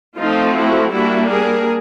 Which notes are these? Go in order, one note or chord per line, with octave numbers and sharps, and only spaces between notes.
F3 A3 C4 D#4 F4
E4 F#4
G3 A#3 D4 E4 F#4
G#4 A#4